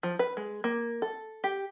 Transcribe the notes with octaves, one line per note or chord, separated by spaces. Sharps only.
F3
B4
G#3
A#3
A4
G4